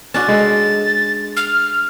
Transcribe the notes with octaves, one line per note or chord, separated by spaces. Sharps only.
C#4 D4 F#4 A6
G#3 A4
F6